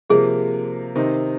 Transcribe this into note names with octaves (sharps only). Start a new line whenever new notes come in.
C3 F3 A#3 G#4
C3 D#3 C4 D#4